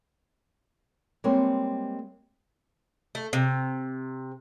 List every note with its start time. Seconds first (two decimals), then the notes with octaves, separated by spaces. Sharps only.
1.24 G3 G#3 A#3 C4 C#5
3.15 A3
3.33 C3